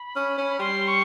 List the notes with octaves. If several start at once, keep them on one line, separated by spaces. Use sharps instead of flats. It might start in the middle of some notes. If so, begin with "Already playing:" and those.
Already playing: B5
C#4
C#4
B5
G3 C6
C#6